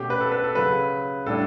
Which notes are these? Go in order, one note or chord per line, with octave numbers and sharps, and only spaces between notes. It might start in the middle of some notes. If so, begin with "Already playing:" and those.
Already playing: B2 A3 C#4 G4
B4
A4
B4
A4
C#3 F#3 C#4 B4
A2 G3 D4 A4